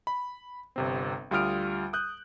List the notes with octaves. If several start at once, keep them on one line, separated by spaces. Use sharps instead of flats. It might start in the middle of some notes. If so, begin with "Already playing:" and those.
B5
G1 C3 C4
D2 G3 F4 D#6 F6 D7
D#6 F#6 G6